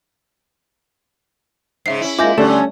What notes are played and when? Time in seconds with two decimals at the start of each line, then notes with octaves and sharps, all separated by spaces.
1.86 G#2 C#3 E5 C7
2.01 C#4 E4
2.19 G#3 A#3 F4 E5 G#5 D6 G6 A#6
2.38 D3 G3 A3 C#4 A4 C#5 D5 A5